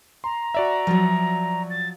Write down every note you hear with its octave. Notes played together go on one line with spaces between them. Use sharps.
A#5 C6
F#4 D5 E5
F3 F#3
A6